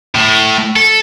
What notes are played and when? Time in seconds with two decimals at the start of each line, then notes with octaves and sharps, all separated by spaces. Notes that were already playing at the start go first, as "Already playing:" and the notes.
0.15 A2
0.76 A4